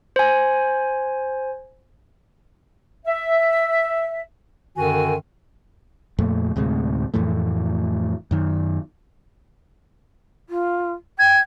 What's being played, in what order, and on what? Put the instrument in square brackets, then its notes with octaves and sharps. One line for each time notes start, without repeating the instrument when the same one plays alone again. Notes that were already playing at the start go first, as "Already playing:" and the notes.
[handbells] C5 G#5
[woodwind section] E5
F#2 D3 D#3 F#4 G#5
[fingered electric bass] F2 A#2 A3
D2 A2 C3 G#3
F2 A2 E3 A3
F#2 D#3
[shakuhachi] F4
[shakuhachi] G5 [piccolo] G#6